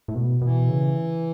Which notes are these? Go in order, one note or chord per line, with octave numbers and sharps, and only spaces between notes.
A2
B2
B2 E3
C#3